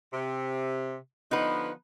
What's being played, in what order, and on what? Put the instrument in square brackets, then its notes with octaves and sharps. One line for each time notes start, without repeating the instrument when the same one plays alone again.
[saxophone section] C3
[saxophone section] D3 F3 B3 [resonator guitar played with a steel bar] D#4 B4